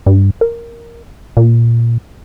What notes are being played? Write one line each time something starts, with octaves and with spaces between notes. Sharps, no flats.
G2
A#4
A#2